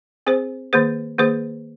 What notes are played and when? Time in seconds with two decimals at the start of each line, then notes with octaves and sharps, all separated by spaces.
0.27 C4 G#4 C5
0.73 D#3 A#3 G#4 C5
1.18 D#3 A#3 G#4 C5